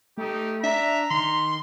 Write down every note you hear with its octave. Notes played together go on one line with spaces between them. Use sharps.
A3 D#4 G4
D4 E5 A#5
D#3 C6